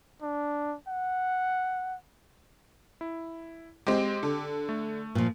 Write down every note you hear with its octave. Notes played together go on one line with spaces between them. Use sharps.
D4
F#5
E4
G#3 C4 G4
D3
A3
A#2 F3